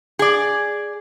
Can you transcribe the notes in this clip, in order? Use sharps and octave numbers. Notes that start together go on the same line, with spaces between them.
G#4 D5